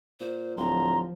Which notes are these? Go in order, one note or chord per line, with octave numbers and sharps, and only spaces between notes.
A#2 C5
D1 F3 A#5 C6